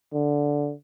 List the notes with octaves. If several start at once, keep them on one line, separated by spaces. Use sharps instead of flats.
D3